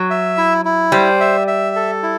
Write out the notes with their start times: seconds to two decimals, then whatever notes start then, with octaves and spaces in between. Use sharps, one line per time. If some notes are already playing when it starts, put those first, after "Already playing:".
Already playing: F#3
0.10 E5
0.37 E4
0.65 E4
0.92 G3 C5
1.20 E5
1.48 E5
1.76 A4
2.03 E4